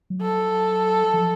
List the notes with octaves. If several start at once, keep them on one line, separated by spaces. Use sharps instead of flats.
F#3
A4
F3